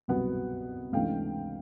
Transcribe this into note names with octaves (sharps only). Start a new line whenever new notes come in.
C2 B2 F#3 B3 F#5
C#2 C3 E3 A3 D4 F5 G5